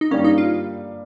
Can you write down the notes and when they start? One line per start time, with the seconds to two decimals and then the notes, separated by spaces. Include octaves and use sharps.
0.01 D#4
0.11 G2 G3 A#3 C#4
0.24 D#4
0.38 F4